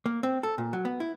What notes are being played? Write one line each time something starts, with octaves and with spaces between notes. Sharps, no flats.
A#3
C4
A4
A#2
F#3
B3
E4